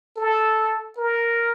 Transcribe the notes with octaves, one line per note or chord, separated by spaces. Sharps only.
A4
A#4